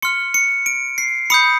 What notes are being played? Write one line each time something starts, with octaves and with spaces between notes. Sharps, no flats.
C6 F6 C#7
C#7
D7
C7
B5 D#6 G6 C#7